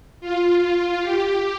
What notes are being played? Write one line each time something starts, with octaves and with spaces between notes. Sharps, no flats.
F4
F4
G4